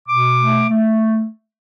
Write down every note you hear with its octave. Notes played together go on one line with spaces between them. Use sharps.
B2 D6
A3
A3